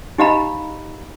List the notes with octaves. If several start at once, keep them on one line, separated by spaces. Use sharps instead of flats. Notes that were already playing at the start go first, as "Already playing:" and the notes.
D#4 G4 D#5 F5 A#5 B5